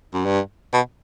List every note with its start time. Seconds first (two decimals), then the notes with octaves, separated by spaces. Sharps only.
0.14 F#2
0.25 G2
0.73 B2